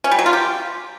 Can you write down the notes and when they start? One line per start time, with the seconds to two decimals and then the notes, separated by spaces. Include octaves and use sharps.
0.04 C#4
0.11 G3
0.19 F#3
0.26 F4
0.33 G4